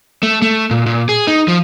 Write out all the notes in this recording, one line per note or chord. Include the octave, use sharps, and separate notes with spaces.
A3
A3
A#2
A#2
G#4
D#4
F3